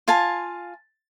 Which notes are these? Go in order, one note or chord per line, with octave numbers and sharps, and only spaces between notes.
F4 F5 G#5 A5